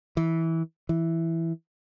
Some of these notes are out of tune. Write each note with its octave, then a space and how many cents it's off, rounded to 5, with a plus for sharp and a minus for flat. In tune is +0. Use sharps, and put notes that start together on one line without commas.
E3 -15
E3 +0